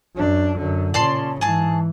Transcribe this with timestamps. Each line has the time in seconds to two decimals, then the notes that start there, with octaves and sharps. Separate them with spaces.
0.15 F#2 D4
0.58 F#2 D3
0.94 A#2 C#3 D5 A5 C6
1.41 G#2 E3 G#4 A5